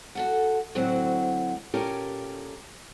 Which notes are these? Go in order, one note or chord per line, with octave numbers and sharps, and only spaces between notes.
F#4 A4 F#5
D2 A2 F#3 C4 F#4 F#5
A#2 C#4 G4 A4 A#4